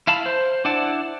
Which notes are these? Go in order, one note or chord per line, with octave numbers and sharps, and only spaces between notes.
E4 F5 A5 B5
C5
D4 E4 D5 F#5 A5